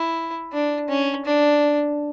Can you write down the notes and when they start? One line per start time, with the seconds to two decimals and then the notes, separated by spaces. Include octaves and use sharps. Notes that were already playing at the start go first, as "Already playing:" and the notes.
Already playing: E4
0.53 D4
0.89 C#4
1.25 D4